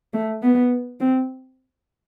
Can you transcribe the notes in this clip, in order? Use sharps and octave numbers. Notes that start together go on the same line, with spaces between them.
A3
B3
C4